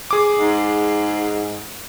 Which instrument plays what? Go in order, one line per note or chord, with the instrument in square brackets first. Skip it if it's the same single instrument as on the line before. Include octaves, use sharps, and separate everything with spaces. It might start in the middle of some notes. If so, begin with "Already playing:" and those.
[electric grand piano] G#4 D6
[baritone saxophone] G#2